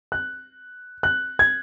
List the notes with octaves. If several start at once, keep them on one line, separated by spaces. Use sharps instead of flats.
F#6
F#6
G#6